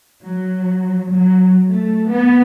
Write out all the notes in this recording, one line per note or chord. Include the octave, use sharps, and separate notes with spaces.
F#3
F#3
A3
B3